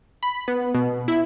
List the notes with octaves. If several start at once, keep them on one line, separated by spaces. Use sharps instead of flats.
B5
B3
B2
E4